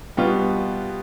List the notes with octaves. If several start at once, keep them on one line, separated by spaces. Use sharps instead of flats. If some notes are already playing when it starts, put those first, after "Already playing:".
B2 G3 B3 F4